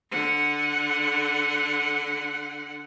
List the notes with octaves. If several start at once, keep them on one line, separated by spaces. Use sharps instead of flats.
D3 F#5